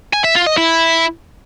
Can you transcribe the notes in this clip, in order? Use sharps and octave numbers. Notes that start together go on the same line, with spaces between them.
G#5
E5
F4
D#5
E4